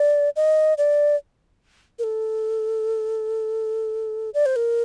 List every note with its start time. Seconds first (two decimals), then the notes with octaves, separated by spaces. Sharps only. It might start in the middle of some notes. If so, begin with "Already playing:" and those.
Already playing: D5
0.36 D#5
0.78 D5
1.99 A#4
2.03 A4
4.34 D5
4.46 C5
4.56 A#4